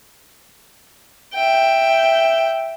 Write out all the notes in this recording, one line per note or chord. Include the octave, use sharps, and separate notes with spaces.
E5 G5